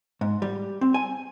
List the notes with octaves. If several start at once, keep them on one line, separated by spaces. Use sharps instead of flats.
G#2
G3
C4
G#5